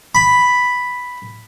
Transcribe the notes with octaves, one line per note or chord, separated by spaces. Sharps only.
B5